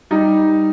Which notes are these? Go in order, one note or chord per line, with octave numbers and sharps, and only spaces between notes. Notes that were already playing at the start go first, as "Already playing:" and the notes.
G3 D#4